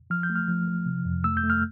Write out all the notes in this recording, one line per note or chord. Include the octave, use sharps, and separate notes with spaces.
F3 F6
G6
A3
F6
F3
F3
C3
F2
A3 E6
G6
A3
F6